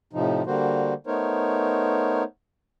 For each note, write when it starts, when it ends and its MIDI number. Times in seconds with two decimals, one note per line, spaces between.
0.13 0.42 45
0.13 0.42 48
0.13 0.42 53
0.13 0.42 63
0.46 0.94 50
0.46 0.94 55
0.46 0.94 58
0.46 0.94 66
0.46 0.94 72
1.07 2.23 57
1.07 2.23 59
1.07 2.23 63
1.07 2.23 70
1.07 2.23 72
1.07 2.23 73